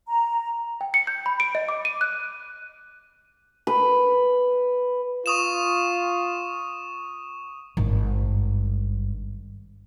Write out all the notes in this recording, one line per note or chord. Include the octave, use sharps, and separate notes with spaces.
A#5
G5
C#7
G6
B5
D7
D#5
D6
D#7
F#6
B4
F4 C#6 D#6 E7
G#1 G2